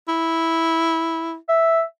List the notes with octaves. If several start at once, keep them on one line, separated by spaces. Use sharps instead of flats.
E4
E5